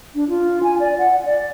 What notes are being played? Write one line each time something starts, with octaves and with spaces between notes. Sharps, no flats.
D4
F4
G#5
D5
F#5
D5